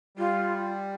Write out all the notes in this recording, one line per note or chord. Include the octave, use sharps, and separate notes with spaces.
G3 F4